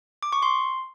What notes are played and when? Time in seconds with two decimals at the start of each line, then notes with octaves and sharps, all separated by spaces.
0.23 D6
0.32 C#6
0.42 C6